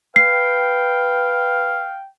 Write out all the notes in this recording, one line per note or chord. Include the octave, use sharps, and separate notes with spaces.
B4 F5 G5 C7